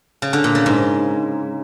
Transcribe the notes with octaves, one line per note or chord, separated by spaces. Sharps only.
C#3
D3
A#2
C#3
G#2